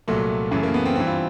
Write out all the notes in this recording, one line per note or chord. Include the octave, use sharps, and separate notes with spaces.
C2 A#2 F#3 A3
F#2 C#3 E3 A3
A#3
B3
C4
G2 E3 C4
F4